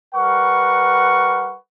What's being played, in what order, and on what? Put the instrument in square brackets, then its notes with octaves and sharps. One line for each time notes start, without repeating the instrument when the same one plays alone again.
[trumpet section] G3 A#4 B4 F#5 C#6